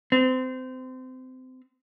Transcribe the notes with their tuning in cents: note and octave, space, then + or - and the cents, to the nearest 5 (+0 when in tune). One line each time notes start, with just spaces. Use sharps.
C4 -25